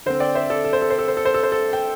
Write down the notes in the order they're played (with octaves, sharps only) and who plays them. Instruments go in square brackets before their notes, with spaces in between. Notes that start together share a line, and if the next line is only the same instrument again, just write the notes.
[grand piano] D3 C4 C5
D5 G5
C5 E5
A4 D5
A4
C5
A4
C5
A4
C5
A4
C5
A4
C5
A4
G5